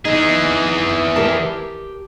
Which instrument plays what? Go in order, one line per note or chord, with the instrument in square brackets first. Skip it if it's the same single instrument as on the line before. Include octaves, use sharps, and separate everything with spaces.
[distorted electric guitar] E3 G#4 [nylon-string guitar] D#4
[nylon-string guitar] G4 A#4 A5